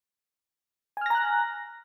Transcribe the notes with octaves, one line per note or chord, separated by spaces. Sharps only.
G#5 A#5 F6 F#6 A#6